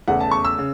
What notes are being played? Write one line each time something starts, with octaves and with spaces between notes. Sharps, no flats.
E2 C#3 A3 F#5
A5
C#6
E6
C#3